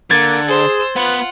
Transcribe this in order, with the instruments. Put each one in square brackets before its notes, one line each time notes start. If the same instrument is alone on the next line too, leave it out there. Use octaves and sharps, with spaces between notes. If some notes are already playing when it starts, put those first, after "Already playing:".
[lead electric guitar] D3 [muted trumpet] A#3 [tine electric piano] G#6 A6
[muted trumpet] G#4 [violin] C5 E6
[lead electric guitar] B3 [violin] F4 F#5 [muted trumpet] B4